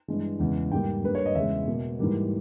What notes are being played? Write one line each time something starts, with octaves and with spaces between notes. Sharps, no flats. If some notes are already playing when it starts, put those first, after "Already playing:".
G2 E3 G#3
E2 C#3 G#3
G#2 G3 A#3 G5
G2 G3 A#3 B4
C#5
D#5
E2 C#3 G#3 E5
B2 A#3
G#2 E3 G3 A#3